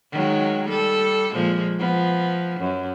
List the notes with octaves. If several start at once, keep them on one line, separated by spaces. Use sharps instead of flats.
D#3 F#3 G#3
G3 A4
A#2 F3 G#3
F3 B3
F#2